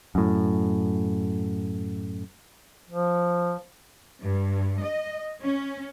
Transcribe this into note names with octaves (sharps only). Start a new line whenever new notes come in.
F#2 A2
F3
G2
D#5
C#4